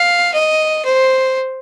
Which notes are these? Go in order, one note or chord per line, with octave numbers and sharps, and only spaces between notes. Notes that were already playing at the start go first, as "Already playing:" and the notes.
Already playing: F5
D#5
C5